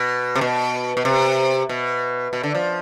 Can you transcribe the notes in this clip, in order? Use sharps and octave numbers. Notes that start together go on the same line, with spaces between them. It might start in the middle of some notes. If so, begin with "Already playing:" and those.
Already playing: B2
C3
B2
B2
C3
B2
B2
D3
F3